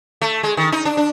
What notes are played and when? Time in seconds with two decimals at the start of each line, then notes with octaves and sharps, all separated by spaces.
0.22 A3
0.43 G#3
0.57 D#3
0.72 D#4
0.85 D4
0.97 D4